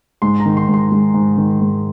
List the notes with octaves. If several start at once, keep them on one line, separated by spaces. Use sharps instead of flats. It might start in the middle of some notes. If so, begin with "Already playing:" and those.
G#2 C6
A#5
D#3
C6
G#2
C6
G#3
G#2
D#3
G#2